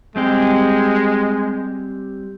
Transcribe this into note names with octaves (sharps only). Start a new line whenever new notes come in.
G3 G#3 C4 G4